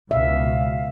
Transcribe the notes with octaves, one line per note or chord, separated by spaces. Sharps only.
C#2 B2 E5 F5